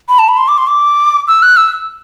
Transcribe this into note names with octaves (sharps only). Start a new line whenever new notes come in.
B5
A5
B5
C6
D6
C6
D6
E6
F#6
E6